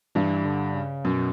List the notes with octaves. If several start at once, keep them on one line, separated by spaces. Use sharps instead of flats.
G2 E3
D3
C#3
F#2 B2